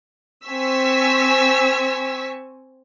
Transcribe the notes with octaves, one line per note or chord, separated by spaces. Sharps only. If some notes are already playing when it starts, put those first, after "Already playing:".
C4 G#5 C#6 E6 B6